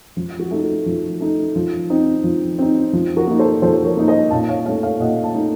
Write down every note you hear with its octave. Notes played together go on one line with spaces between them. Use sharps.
F3 F4
F#4
A3 D#4
F#4
F3
A3 D#4
F3 F4
C4 D#4
F3
C4 D#4
F3
F#4 A#4
A#3 D#4
A4 C5
F3 A4 C5
C5
A#4 C#5
A#3 D#4
C5 D#5
A#2 F5 A5
C#5 F5
A3 D#4 C#5 F5
C#5 F5
A#2 D#5 F#5
F5 A5
A3 D#4